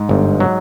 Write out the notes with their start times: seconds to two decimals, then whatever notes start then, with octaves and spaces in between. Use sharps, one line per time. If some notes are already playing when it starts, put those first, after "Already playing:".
Already playing: G#2
0.09 G1
0.40 F#3